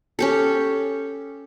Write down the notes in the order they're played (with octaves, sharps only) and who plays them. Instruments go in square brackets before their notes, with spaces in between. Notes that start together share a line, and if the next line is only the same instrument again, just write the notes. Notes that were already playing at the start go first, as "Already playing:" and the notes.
[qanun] C#4 G4 A4